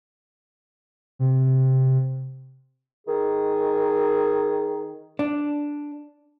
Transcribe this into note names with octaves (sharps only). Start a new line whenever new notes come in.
C3
D#3 G#4
D4